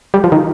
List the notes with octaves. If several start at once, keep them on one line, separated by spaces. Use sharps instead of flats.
G3
F3
D#3